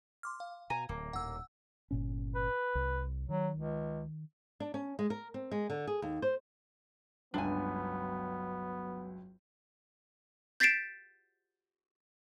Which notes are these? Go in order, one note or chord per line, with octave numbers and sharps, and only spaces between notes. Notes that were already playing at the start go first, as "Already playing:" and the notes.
C6 D6 F6
F5
B2 G#5 A#5
D1 A2 A#3
D#1 D#2 A2 F#5 E6
G1 A#2 C#4
B4
C2
D#3 F#3
C#2
D4
C#4
G#3
A#4
C4
G#3
D3
G#4
D#2
C5
G1 C#2 F#3 B3 D4 G#5
G6 A6 B6 C7 D7 E7